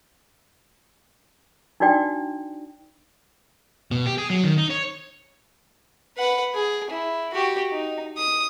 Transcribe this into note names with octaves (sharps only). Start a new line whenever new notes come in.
D4 D#4 F#4 D5 G5
B2
G4
G#4
F#3
D#3
D#4
C#5
B4 F#5
G#4
E4
F#4 G4
D#4
D#6